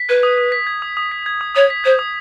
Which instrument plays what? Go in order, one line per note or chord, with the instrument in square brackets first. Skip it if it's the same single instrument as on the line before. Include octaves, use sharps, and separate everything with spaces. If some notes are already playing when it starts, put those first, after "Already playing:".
Already playing: [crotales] B6
[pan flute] B4 [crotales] G#6
[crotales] D#6
D#6
B6
G#6
D#6
D#6
B6
G#6
D#6
[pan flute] C#5 [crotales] D#6
[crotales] B6
[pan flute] C5 [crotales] G#6
[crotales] D#6